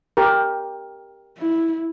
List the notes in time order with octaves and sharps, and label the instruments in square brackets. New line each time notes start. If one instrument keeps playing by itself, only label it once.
[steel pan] G4 A#4
[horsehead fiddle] E4